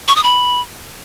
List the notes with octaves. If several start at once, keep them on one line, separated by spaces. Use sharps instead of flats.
C#6
D#6
B5